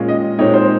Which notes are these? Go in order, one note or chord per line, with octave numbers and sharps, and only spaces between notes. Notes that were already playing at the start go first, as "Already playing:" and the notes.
Already playing: A#2 G#3 C#4 F4
D#5
A#2 G#3 C4 D#4 C#5
C5